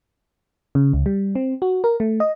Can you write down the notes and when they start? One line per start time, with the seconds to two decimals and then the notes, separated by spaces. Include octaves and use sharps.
0.75 C#3
0.93 C#2
1.06 G3
1.35 C4
1.62 F#4
1.84 A#4
2.00 A3
2.20 D#5